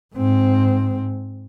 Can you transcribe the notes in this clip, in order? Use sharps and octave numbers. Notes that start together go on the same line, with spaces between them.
G#2 C4